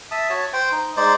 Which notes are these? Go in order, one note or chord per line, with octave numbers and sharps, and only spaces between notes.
E5 A5 D#6
F#4 C#5 A5
C5 G5
D#4
G#3 D#4 C5 D5